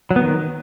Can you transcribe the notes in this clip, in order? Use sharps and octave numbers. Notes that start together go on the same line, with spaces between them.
F#3
B3
D#3